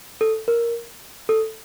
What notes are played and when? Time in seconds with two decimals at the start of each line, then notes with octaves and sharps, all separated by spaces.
0.21 A4
0.48 A#4
1.29 A4